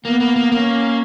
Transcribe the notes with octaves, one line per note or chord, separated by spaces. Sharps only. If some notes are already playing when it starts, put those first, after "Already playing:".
A#3 B3
A#3
A#3
A#3 C#4